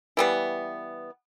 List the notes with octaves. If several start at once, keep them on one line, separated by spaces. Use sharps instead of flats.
E3 G3 B3